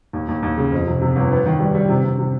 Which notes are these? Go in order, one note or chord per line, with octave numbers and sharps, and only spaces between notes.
D#2
D#2
D#2
C#3
F2
C3
C3
G1
B3
D#3
G3
G3
C3
C3
C3